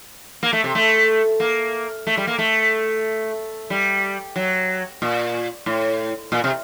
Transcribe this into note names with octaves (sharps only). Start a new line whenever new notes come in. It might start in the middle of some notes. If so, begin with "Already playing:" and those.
A#3
A3
C3
A3
A#3
A3
G3
A#3
A3
G3
F#3
A#2
A2
A#2
C3